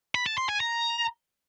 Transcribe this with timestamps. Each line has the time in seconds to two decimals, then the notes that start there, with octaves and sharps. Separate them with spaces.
0.15 B5
0.26 A5
0.38 C6
0.49 G#5
0.60 A#5